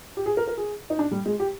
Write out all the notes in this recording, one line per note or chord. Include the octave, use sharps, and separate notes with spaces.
G4
G#4
A#4
A#4
G#4
D#4
D4
G3
G#3
G4